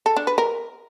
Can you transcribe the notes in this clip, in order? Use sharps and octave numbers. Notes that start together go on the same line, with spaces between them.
A4
D4
B4
A#4